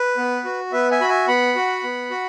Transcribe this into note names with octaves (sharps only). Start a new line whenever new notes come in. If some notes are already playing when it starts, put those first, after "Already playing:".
Already playing: B4
B3
F#4
B3 B4 E5
E5 G#5
F#4 B5
E5 G#5
B3 F#5 B5
F#4
B3
F#4